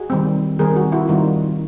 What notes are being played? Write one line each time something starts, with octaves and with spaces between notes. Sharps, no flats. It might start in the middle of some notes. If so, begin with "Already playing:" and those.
Already playing: F#4 G#4
D#3 G3 C4
D#3 G3 C4 G#4 A#4
F#4 G#4
E4 F#4
D#3 G3 C4 D#4 F4